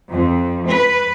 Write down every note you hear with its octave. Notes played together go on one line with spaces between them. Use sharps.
F2
B4